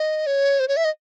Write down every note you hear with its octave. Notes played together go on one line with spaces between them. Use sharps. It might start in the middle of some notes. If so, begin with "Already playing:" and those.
Already playing: D#5
C#5
C5
C#5
E5
D#5